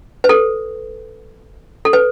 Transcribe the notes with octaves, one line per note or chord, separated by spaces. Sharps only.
B4
A4
A4
B4